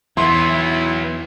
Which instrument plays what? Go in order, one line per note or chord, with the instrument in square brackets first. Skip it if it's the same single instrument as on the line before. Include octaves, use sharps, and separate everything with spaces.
[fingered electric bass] E2 [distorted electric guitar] F#3 B3 [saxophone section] E4 [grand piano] C6